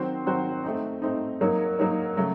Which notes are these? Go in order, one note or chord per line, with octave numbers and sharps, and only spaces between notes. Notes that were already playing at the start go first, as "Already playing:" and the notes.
Already playing: D#3 F#3 C4 F#4 C5
D#3 F#3 C4 F#4 C5
A3 C4 D#4
A3 C4 D#4
F#3 A#3 D#4 A#4 C#5
F#3 A#3 D#4 A#4 C#5
C#3 F#3 A3